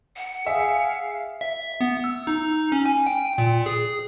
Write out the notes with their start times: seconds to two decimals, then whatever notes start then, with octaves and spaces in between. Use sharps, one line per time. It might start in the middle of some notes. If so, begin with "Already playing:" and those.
0.16 F#5
0.46 G#4 E5 F5
1.41 E5
1.81 B3
2.04 E6
2.27 D#4
2.72 C#4
2.86 G#5
3.07 G5
3.38 A#2
3.66 G#4